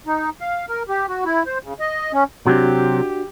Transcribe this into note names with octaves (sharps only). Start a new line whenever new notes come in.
D#4
F5
A#4
G4
F#4
E4
C5
C#3
D#5
C#4
C3 F#3 C4 D4 F#4 G4